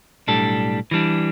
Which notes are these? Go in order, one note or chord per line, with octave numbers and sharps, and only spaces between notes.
B1 A2 G3 D4 A4
E3 G3 D4